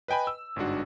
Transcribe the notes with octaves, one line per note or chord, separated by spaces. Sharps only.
B4 D#5 G5 G#5 B5
E6
G1 G#2 D4 F#4